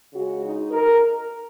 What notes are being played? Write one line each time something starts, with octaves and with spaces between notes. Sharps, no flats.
C#3 G#3 F#4
D#4
A#4